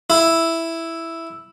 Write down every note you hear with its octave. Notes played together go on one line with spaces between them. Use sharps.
E4